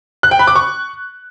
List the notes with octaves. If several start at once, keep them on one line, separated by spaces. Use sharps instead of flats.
F#6
G5
B5
D6
C#6